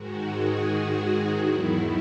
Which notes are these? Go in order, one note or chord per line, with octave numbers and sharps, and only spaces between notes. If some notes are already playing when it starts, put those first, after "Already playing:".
Already playing: G#2 D#3 G#3 F#4
G#4
F#4
E2 D#3 F#3 E4